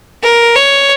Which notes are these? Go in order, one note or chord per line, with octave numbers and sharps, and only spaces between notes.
A#4
C#5